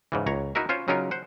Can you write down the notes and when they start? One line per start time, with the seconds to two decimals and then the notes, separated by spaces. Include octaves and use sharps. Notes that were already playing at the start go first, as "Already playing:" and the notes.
0.12 G#2 C#3 E3
0.26 C#2 C#5 A#5
0.55 D#4 E4 F#4 A#4 E5
0.69 C#4 F4 C5 C#5
0.88 C#3 F#3 C#4 D#4 F4 A#4
1.11 C5 F#5